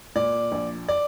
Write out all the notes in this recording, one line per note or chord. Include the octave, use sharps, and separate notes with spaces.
A#2 D5
A#1
D5